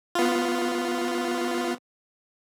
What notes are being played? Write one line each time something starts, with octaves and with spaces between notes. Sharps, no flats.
B3 F4